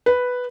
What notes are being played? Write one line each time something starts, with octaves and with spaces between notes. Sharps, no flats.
B4